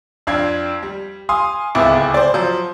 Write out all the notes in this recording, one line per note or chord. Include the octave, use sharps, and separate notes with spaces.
F2 D4 F5 G#6
G3
F5 G#5 C6 D#6
D1 C#2 B3 E4 D6
C5 D5
F3 F#3